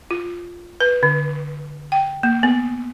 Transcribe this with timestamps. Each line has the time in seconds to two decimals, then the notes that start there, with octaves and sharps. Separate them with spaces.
0.11 F4
0.80 B4
1.03 D3
1.92 G5
2.23 A#3
2.43 B3